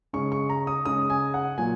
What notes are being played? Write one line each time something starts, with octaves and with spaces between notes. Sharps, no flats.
C#3 G#3 C#4 C#6
C#6
A#5
D#6
C#3 G#3 C#4 D#6
G#5
F#5
A#2 F#3 A#3 G#5